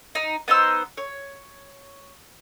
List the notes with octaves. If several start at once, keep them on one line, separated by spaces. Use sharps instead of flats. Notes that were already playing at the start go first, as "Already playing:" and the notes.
D#4
B3 D#4 C5 E6
C#5